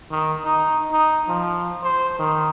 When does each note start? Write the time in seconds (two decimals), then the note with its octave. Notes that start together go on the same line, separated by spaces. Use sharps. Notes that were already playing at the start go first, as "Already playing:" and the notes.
0.11 D#3
0.45 D#4
0.92 D#4
1.28 F3
1.83 C5
2.19 D#3